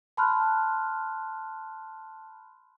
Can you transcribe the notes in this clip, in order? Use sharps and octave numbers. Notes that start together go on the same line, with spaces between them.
A5 B5 C6 F6 F#6